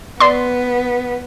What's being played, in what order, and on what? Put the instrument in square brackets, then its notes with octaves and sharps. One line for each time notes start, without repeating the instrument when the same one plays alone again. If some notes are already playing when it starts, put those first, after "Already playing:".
[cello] B3 [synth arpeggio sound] D5 C6